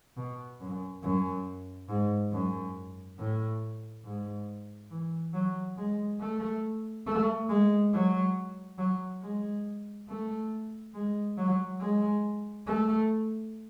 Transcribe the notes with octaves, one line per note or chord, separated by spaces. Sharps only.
B2
F#2
F#2
G#2
F#2
A2
G#2
E3
F#3
G#3
A3
A3
G#3
F#3
F#3
G#3
A3
G#3
F#3
G#3
A3